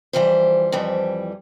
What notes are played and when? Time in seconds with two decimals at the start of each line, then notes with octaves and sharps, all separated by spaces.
0.13 F2 E3 G3 C5
0.72 F2 E3 G3